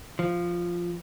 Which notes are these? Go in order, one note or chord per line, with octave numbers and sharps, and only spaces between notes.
F3